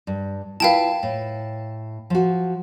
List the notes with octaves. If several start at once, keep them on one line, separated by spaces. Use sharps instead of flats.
G2
E4 F4 B4 F5 G5 A5
A2
F3 F#4